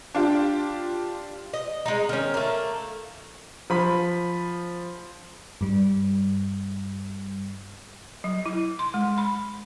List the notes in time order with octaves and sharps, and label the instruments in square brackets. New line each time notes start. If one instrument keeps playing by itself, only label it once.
[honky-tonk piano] D4 F4 G4
[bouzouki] D#5
G#3 D#4
D#3 C#4
A3 A#3
[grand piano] F3 B5
[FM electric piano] G2 G3
[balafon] F#3
E4
C6
G#3
B5